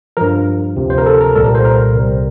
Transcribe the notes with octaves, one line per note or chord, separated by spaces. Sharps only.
G2 F3 A#4
D2 C3 F3
C5
A#4
A4
A#4
C2 A#2 G3 A4
A#4
C5
A#4
C2 C3 G3